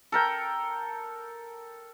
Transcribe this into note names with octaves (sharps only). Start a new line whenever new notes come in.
A4 A#4 G5